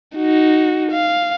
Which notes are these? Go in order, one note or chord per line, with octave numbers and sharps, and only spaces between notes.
D#4 F#4
F5